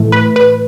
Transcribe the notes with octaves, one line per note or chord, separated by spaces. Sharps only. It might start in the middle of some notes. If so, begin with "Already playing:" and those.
Already playing: A2 E3 A3
B4
B4